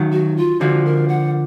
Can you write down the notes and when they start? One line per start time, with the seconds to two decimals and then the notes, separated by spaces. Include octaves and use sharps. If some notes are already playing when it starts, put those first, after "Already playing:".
Already playing: D#3 F#3
0.12 F#4
0.37 F4
0.61 D3 F3 F#4
0.86 A#4
1.08 F#5